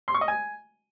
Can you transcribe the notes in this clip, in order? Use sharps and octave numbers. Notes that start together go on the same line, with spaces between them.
C6
C#6
D#5
G#5